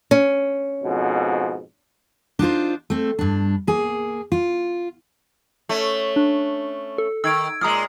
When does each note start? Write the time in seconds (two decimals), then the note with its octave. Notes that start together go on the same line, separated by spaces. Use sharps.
0.11 C#4
0.83 F2 G#2 B2
2.39 D4 D#4 F4 C5
2.90 A3 C4
3.19 G2 D4
3.67 A#3 G#4
4.32 F4
5.69 A3 C#4
6.16 D4
6.98 A4
7.24 D#3 E6 G#6 D7
7.61 A#2 G#3 A#5 D#6 F6